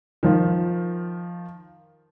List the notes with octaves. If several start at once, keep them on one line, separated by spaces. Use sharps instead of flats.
D#3 F3 F4